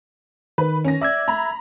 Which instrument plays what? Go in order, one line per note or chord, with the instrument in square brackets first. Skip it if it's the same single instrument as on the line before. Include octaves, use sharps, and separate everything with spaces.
[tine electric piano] D#3 [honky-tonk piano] B4
[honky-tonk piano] C#4 A#6
[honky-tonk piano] D5 [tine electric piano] E5 E6 G#6
[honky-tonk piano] A#5 B5